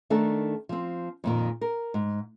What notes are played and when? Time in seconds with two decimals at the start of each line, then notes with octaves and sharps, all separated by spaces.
0.10 D#3 A3 D4 D#4 A4
0.69 F3 C4
1.24 F2 A#2 D#3
1.61 A#4
1.94 G#2